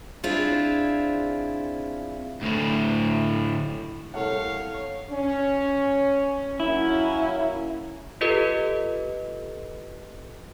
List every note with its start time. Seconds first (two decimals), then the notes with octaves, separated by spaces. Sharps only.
0.23 C4 D4 E4 F4 G#4
2.42 D2 A2
4.14 C2 A4 C#5 F5 F#5
5.10 C#4
6.60 F#3 A#3 C#4 E4
8.21 F4 G4 A4 B4 D#5